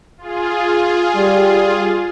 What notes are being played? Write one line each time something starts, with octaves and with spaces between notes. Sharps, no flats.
F4 G#4
G3